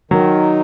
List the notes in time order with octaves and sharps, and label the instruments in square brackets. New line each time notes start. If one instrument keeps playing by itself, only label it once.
[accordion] D#3 [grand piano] F#3